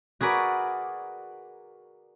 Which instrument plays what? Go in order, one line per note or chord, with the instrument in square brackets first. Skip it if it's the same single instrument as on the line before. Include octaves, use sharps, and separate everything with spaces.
[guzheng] F#4 G#4 A#4 B4 D5